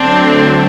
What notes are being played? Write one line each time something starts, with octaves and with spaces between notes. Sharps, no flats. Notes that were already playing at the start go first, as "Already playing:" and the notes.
Already playing: D3 F#3 A3 C4 D4